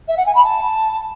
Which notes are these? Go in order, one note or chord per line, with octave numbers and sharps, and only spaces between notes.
E5
F#5
G#5
B5
A5